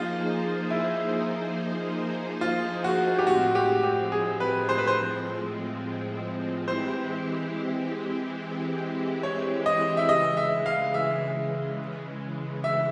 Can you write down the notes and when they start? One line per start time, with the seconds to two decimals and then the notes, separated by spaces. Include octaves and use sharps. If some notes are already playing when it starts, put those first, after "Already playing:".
Already playing: F3 A#3 D#4 F4 G#4 C5
0.70 E4
2.41 F4
2.84 F#4
3.18 G4
3.26 A2 F3 G#3 C4 F#4
3.55 G4
3.83 G4
4.12 G#4
4.40 B4
4.69 C5
4.78 B4
4.87 C5
6.68 E3 G#3 C4 E4 G4 C5
9.23 C#5
9.66 D#5
9.97 E5
10.08 C#3 E3 G#3 D#5
10.37 E5
10.66 F5
10.94 E5
12.64 E5